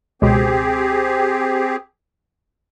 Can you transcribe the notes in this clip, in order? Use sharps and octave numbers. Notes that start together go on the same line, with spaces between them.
C#2 B2 C4 G4 G#4